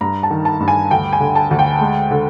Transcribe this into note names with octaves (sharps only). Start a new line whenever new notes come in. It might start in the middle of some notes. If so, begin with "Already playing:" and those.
G2 A#5
A5
D#3
A5
G2
G#5
D2 G5
G#5
D3
A5
D2
G5
G#3
D3